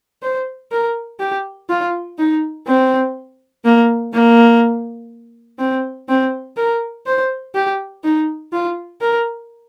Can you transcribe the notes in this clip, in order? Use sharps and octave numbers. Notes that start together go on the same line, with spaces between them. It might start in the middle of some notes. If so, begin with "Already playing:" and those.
C5
A#4
G4
F4
D#4
C4
A#3
A#3
C4
C4
A#4
C5
G4
D#4
F4
A#4